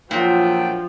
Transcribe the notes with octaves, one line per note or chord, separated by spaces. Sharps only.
A#2 F3 F#3 D4 G5